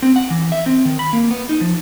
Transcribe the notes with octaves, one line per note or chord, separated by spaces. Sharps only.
C4
F#5
E3
E5
C4
D#3
B5
A#3
B3
D#4
F3